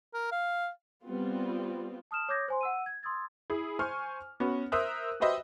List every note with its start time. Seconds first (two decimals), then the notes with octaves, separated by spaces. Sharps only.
0.14 A#4
0.32 F5
1.04 G3 B3 C4 F4
2.11 A5 D#6 F6 E7
2.29 C#5 D6 D#6 G6 G#6 A#6
2.48 C5 G#5 C6
2.61 F#5 E6 D#7
2.86 G#6
3.03 C6 D#6 E6 G#6 A6
3.50 E4 G#4
3.79 C5 G#5 C#6 F6
4.40 B3 C#4 F#4
4.72 A#4 C5 E5 D#6 E6 F#6
5.20 F#4 G4 B4 C5 D#5 E5